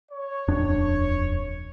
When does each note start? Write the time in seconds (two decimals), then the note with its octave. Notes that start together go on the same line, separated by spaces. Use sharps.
0.12 C#5
0.48 D#1 F2 D4